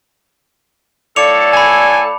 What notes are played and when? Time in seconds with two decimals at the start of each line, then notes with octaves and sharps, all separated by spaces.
1.16 A2 A4 D5 F5 D6 C#7 F7
1.53 G#5 A5 B5